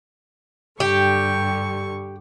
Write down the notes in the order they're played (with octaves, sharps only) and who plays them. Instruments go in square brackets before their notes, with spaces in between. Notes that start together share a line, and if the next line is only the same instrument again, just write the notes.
[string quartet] G2 D3 C#6 [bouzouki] G4